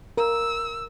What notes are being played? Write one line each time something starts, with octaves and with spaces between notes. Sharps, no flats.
A#4 E6